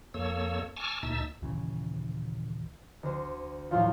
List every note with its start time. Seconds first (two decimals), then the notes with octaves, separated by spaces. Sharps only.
0.14 F2 A#3 A4 C#5 E6
0.77 G#5 A5 C#6 D6 E6 F6
1.03 D2 A#2 D#4 E5 A5 E6
1.42 D#1 D#2 C#3 E3
3.03 D2 C5
3.71 E2 A2 F#3 F4